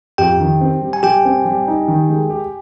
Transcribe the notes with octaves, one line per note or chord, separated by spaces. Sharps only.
F2 G4 G5
D#3
C4
G3
G#5
G3 G4 G5
C4
G3
D#4
D#3
G#3
G4